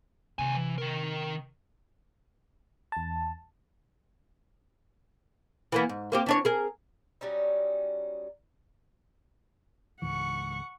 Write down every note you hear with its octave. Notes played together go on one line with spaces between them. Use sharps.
D#2 C3 G#5
E3
D#3 A#4
E2 A5
E3 A#3 B3
G#2
A#3 C4 G4
E3 D4 C#5
G#4 A#4
F#3 G3 C#4 D#4
C#2 G#2 E3 F#5 C#6